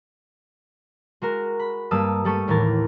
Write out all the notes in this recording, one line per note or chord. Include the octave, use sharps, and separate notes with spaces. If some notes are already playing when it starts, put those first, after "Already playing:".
G#3 F#4 A#4
B5
G2 G3 A#3 A5 D#6 E6
G3 A3 A4 C#6 D#7
D#2 A2 E3 A#4 A6